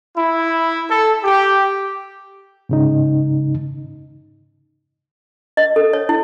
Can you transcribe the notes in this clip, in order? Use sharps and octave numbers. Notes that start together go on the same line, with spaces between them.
E4
A4
G4
G#2 C#3 D#4
D#5
A4
C#5
E4